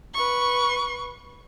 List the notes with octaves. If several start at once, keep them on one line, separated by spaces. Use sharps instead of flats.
B4 C#6